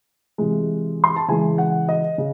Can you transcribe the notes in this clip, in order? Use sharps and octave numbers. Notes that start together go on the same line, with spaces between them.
C3 E3 G#3
C6
A5
C#3 E3 G#3 G#5
F#5
D#5
C#3